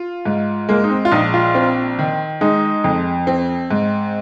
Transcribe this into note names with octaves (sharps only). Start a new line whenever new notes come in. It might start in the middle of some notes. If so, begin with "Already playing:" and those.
Already playing: F4
G#2
G#3 A#3
D#4
C4
F4
A#1 D#4
F4
C4
D#3
G#3 D#4
F2
C4
G#2